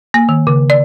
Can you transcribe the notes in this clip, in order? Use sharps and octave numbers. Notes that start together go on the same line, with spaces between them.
A#3
D#3
C#3
D5